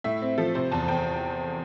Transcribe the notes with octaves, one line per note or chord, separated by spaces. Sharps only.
A2 E5
C4
F3 A4
C3 C5
E2 A5
E2 G5